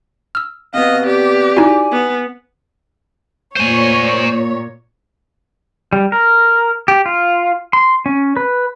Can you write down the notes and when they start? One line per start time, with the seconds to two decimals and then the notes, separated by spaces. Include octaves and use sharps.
0.35 E6 F6
0.74 C3 B3 D#5 F5
1.06 G4 D5
1.57 D#4 E4 F#4 G#5
1.92 B3
3.57 A#2 C5 C#5 G#5
5.93 G3
6.12 A#4
6.88 G4
7.06 F4
7.73 C6
8.06 C#4
8.37 B4